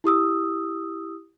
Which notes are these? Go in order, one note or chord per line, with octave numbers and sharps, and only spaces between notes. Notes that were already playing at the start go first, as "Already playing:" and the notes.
E4 G4 D#6 E6